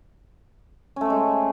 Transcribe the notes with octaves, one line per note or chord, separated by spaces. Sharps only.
G#3 A3 C4 C#4